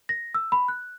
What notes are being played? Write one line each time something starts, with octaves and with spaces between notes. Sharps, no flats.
A#6
E6
B5
F#6